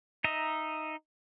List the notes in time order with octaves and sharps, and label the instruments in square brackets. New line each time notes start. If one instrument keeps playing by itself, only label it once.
[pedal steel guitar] D#4 D#5 E5 A#5